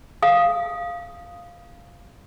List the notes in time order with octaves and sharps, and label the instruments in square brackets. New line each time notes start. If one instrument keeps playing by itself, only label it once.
[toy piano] F5 D#6